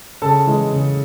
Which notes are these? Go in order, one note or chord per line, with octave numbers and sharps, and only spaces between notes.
C#3 A4 A5
E3 G#3
C#3